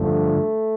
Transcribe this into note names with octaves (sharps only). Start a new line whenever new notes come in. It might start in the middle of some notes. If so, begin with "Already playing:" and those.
Already playing: G2 D3 F3 A3